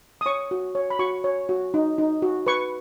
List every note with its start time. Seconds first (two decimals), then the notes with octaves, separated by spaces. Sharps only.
0.21 D#6
0.26 C#5 C#6
0.51 F#4
0.75 C#5
0.90 B5
0.99 F#4 C#6
1.24 C#5
1.49 F#4
1.74 D#4
1.98 D#4
2.22 F#4
2.47 B4 C#6